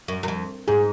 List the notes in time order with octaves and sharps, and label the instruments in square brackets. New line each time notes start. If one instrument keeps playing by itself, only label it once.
[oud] F#2
F#2
F2
[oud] G#2 [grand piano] G#4